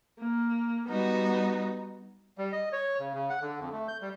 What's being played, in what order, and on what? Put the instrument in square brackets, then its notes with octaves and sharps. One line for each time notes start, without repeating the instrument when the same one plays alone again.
[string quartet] A#3
G3 B3 D#4 F#4
[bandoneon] G3
D#5
C#5
C#3
C#3
F#5
D3
F2
A3
G6
G3